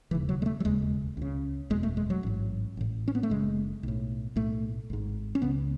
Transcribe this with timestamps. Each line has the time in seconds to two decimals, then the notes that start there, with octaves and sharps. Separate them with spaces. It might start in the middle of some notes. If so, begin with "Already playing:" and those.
0.11 E1 D#2 C#3 E3
0.29 F#3
0.42 G#3
0.46 A3
0.60 F#3
0.65 E1 D#2 C#3 G#3
1.17 C#2 C#3
1.70 F#1 E2 B2 G#3
1.83 A3
1.97 G#3
2.10 F#3
2.23 A1 G#2
2.77 A1 A2
3.08 C#4
3.15 B3
3.23 A3
3.30 F#1 F#2 C#3 G#3
3.83 B1 A2
4.36 B1 A2 A3
4.90 G#1 G#2
5.35 C#4
5.42 C#2 C#3 B3